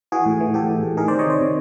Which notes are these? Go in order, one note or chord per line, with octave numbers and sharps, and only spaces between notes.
E3 F#4 G#4
A2
E3
A2 G4 A4
E3
A2
D#3 G#4 A#4
C3 C5 D5
C#5 D#5
D#3 C5 D5
C3